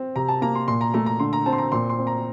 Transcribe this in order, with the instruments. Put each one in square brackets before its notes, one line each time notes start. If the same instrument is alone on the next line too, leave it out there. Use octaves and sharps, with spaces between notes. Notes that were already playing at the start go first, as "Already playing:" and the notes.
Already playing: [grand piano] C4
C3 A#5
A5
A#3 A#5
C6
A#2 C6
A#5
A3 A#5
A#5
D3 C6
A#5
C4 A5
C6
A#5
A#2 C6
C6
C4
A#5